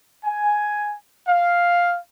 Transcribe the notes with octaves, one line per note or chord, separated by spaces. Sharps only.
G#5
F5